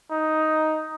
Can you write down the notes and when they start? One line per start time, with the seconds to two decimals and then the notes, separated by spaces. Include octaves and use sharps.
0.11 D#4